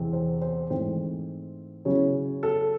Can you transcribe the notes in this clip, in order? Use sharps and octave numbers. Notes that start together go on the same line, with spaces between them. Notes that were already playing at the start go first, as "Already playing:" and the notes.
Already playing: E2 C3 E3 G#3 C4
C5
C5
G#2 E3 A3 C4 C5
C#3 F#3 C#4 E4 C#5
A4